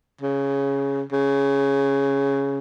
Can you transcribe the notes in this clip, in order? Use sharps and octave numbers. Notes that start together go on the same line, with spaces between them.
C#3
C#3